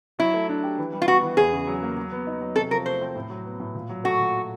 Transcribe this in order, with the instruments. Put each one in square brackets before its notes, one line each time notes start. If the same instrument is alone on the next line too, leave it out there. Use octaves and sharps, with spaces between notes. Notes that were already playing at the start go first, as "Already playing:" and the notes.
[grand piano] F#3 [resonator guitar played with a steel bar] E4
[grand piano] A3
D4
G4
E3
G3
[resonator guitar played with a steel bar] F4
[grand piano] B3 [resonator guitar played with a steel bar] F#4
[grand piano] E3
[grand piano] E2 [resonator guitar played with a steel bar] G#4
[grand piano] C#3
F#3
A#3
F#3
B3
D#4
F#3
[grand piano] C3 [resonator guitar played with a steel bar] A4
[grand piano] F3 [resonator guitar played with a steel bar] A#4
[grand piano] A3 [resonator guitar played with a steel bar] C5
[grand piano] C4
A2
F#3
B3
A2
A#2
F#3
[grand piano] A3 [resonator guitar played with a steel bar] F#4
[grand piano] A#2